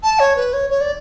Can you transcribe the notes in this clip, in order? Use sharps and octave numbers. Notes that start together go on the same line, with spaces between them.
A5
C#5
B4
C#5
C#5
D5